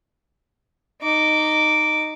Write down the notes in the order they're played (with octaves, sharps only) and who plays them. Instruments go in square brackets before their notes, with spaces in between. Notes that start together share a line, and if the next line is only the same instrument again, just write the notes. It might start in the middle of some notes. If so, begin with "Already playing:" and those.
[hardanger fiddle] D#4 D6